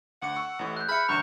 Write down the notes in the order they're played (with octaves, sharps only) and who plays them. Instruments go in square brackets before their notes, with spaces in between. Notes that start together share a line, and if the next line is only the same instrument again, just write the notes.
[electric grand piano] D2 D6 C#7 [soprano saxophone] F#5
[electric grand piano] C#6 E6
A1 A2
[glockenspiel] F#6 G6
[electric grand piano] G#4 E5 [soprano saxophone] B5 [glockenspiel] F6 F#6 C#7
[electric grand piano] A1 D2 G2 [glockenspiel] A#5 G6 E7 [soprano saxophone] C#6